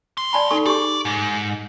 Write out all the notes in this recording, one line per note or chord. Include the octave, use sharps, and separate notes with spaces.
D2 C6
D5 A5 B5
D#4 A4 C#6
G4 G#4 D5 C#6
G#2